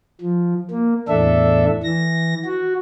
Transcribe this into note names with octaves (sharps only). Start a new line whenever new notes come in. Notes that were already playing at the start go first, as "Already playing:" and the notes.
F3
A#3
E2 A2 D4 A4 E5
E3 A#6
F#4